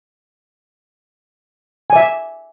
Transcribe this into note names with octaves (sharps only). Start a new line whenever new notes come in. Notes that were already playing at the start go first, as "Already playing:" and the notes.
D5 E5 G#5